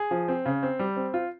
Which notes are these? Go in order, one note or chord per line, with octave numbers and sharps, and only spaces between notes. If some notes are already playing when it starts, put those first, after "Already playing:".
Already playing: G#4
F3
C4
C#3
C4
G3
C4
F4